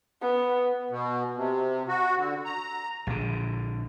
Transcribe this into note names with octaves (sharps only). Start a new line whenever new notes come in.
B3
B2
C3
F#4
D3
A#5
A#1 D3